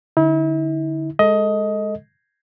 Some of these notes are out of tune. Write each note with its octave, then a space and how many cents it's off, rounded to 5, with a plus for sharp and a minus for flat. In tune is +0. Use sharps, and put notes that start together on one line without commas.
D3 +5 E4 -40
G#3 +0 A4 +10 D#5 +15